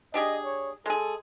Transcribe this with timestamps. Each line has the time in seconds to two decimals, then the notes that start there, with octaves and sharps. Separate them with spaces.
0.14 D4 G4 G#4 D#5
0.45 C#5
0.86 G#3 G#4 A4